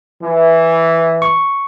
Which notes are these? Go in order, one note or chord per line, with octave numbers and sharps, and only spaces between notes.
E3
C#6